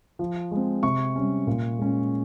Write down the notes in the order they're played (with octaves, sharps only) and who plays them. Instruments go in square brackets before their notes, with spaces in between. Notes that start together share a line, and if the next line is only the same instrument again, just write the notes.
[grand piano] F3
G#3
C4
C3 C#6
G3 C#4
A#2
G#3 C#4